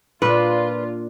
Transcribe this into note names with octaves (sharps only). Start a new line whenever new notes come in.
A#2 D4 F4 B4